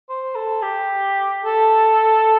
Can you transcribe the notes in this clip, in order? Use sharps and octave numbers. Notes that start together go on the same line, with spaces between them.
C5
A4
G4
A4